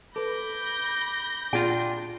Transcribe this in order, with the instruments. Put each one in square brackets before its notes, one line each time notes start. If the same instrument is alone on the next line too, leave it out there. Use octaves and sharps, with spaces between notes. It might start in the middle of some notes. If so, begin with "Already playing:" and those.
[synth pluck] A4 B4 [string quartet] B5 G6 A#6 [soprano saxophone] D6
[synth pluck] A#2 G#4 [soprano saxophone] D4 [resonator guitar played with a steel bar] F4 G5